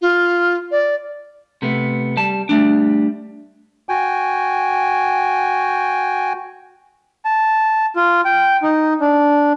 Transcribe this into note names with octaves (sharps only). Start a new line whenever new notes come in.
F4
D5
C3 A3 B3
G3 A5
G3 A3 D4
F#4 G5 G#5
A5
F4
G5
D#4
D4